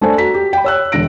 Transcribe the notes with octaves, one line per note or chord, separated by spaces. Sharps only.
A3 D4 A4 C5 G#5
F#4 A#5 B6
G4
G5 B5
C#5 E6 F#6
E1 D3 A#6 D7